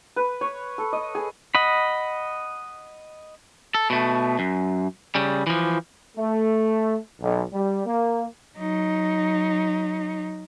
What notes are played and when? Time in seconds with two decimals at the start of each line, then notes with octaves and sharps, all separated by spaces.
0.16 B4
0.41 C#5
0.78 A4
0.93 D#5
1.15 G#4
1.55 D#5 F#5 B5
3.75 A4
3.90 B2 A3
4.39 F#2
5.15 C#3 G3
5.47 E3 F3
6.17 A3
7.20 B1
7.53 G3
7.85 A#3
8.57 F#3 D#4